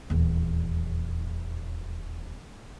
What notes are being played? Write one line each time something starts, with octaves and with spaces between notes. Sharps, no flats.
D#1 E2